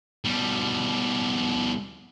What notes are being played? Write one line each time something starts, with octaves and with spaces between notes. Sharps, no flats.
B2 G3